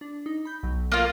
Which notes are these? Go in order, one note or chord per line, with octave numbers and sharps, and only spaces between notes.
D4
D#4
B5 G6
B1 F#3
A#3 F4